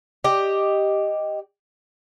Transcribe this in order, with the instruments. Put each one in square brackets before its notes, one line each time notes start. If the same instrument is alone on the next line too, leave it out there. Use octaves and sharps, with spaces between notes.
[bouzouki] G4 D#5